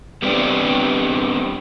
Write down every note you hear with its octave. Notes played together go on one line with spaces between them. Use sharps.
G3 B3 C4 D4 G4